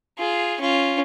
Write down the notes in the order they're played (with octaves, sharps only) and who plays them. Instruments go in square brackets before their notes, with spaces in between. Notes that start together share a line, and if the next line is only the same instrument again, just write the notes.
[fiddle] F4 G#4
C#4 F4